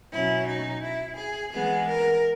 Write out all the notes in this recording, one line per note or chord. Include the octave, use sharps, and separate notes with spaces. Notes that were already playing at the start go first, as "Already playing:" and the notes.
B2 F#3 C#4 E4
D#4
E4
G#4
E3 G#3 B3 G#4
A#4